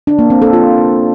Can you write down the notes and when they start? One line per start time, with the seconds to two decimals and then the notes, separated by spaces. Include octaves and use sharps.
0.07 D4
0.19 A#3
0.30 C4
0.42 A4
0.53 F4